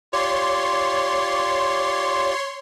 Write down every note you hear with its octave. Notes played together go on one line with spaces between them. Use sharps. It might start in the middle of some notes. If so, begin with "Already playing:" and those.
F4 G4 C#5 D5 C6